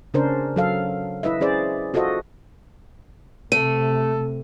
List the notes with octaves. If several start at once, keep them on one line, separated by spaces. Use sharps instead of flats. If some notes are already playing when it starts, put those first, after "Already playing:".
C#3 C#4 D4 A#4 C5
F#3 A4 F5
E4 B4 D#5 E5
C#4 G#4 C5 D5
F4 F#4 A4 C5 D#5
C3 A3 A4 D#7